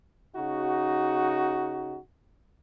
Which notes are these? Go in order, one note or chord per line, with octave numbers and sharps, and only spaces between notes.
C#3 D#4 F#4